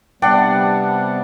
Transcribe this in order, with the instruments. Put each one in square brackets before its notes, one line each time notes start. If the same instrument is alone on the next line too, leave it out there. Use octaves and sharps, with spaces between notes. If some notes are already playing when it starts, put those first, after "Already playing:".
[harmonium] C3 G3 B3 [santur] D4 F#5 [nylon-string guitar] G5